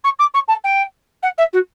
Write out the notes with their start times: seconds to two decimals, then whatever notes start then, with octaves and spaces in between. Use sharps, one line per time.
0.04 C#6
0.19 D6
0.34 C#6
0.48 A5
0.64 G5
1.22 F#5
1.38 E5
1.53 F#4